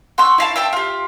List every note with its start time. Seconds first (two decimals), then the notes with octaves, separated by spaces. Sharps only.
0.18 F#5 C6 C#6 E6
0.38 E4 F5 A5
0.56 E5 G5 A5
0.73 F4 G4